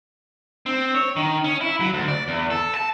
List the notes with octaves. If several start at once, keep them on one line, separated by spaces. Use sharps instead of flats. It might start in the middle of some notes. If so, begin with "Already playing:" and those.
C4
C#5
D#3
C#4
E4
F#3
D2
D5
E2
A4
A5